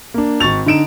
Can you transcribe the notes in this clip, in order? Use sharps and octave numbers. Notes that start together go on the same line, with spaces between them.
A#3 D4
G#1 C#6 A6 F7
D3 D#4 D7 E7